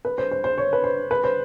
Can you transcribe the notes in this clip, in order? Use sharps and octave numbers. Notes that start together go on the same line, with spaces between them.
B4
C5
C5
C5
C#5
B4
C5
B4
C5